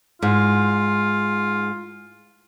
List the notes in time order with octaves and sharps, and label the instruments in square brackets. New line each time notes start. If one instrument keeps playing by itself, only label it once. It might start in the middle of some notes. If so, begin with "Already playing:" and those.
[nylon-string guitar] G#2 [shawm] F4